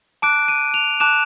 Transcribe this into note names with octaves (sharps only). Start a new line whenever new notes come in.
A5 D6 F#6 D7
D#7
F7
A5 D6 F#6 E7